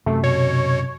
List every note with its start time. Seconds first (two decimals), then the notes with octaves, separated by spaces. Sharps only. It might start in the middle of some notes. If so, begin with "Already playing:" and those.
0.06 F#2 C3 A3
0.24 B2 C#5